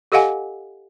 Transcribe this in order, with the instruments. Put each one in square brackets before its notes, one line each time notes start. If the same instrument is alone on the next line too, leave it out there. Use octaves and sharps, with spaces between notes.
[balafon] G4 A4 D#5 F5 F#5 G#5